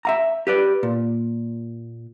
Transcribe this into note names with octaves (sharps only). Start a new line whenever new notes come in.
E5 F5 A#5
G4 B4 D5
A#2